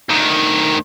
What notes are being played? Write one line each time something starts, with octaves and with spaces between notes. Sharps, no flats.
D2 D#3